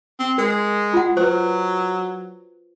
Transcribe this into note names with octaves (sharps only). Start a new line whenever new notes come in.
C4
G#3 A#4
F4 F#5
F#3 B4 C5